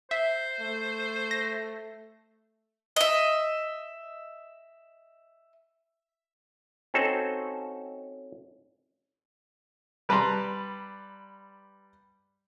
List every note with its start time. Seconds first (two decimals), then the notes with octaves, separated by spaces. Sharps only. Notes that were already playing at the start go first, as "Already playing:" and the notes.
0.11 C5 E5
0.61 A3
1.31 A#6
2.96 D#5 E5
6.94 C4 C#4 D#4 F#4 A4 C5
10.09 G3 B4 A5 A#5 C6